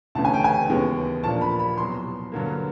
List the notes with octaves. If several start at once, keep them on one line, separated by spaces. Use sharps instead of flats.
D2 C#3 E3 A3 C#4 A5
G#5
G5
G#5
D#2 C#3 E3 G#3 B3
A#2 F3 A#3 D4 A5
B5
B5
C2 B2 F#3 C6
G2 D3 F#3 A#3